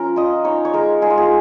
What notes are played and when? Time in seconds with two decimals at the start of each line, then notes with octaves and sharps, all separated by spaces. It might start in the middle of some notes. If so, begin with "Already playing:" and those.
Already playing: F3 C#4 A#4
0.16 F4 D#5
0.44 D#4 C#5
0.65 C#5
0.73 G#3 A#4
1.02 G#3 G#4
1.10 F4
1.18 G#4